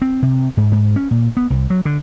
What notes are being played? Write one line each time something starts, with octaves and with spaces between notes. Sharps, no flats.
C4
C3
G#2
G#2
C#4
A#2
B3
C2
F#3
D3